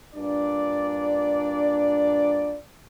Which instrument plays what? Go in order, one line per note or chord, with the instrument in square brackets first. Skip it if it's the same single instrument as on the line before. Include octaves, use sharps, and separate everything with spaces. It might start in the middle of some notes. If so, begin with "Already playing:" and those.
[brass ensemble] G2 A#2 D4 D5